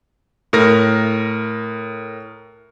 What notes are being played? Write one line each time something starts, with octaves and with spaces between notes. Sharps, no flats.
A2 A#4 A#6